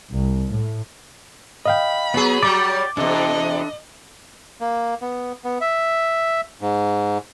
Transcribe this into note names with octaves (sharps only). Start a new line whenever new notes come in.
C2
A2
D#5 F5 G5 B5
F#3 B3 G#4
F#3 G3 D5 G5 D6
E2 C3 D4 A4 D#5
A#3
B3
B3
E5
G#2